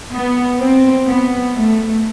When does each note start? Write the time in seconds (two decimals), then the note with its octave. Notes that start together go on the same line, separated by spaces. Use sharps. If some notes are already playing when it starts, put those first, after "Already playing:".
0.13 B3
0.59 C4
1.07 B3
1.54 A3